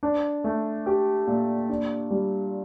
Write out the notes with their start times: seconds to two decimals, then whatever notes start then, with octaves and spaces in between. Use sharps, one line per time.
0.03 D4
0.44 A3
0.86 G4
1.27 A#2
1.69 D4
2.11 G3